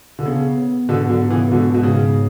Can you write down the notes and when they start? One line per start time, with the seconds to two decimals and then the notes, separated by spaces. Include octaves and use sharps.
0.19 D3
0.26 C#3 B3
0.57 B3
0.89 G#2 B2 D3
1.09 D3 F#3
1.20 B3
1.30 C#3 E3
1.51 B2 D3 G#3
1.74 B2
1.83 G#2 C#3